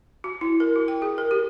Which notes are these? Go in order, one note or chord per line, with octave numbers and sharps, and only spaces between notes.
F#4
E4
A#4
F#4
G5
G#4
A#4
G4